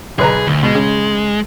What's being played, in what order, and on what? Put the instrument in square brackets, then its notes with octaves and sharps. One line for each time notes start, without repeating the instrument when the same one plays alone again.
[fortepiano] B1 B4 A#5 [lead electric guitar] G#4
[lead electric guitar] D2
[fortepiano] B2 [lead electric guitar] G#3
[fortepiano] C#3